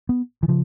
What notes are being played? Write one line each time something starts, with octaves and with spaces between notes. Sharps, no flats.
B3
E3
C#3 F3